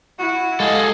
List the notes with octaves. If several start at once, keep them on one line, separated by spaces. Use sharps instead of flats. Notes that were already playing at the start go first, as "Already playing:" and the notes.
E4 F#4
G#3 G#4 A4 D#5 F5